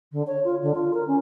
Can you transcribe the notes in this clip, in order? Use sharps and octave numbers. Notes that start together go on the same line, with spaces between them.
D3
C#5
F4
D3
F4
A#4
C#4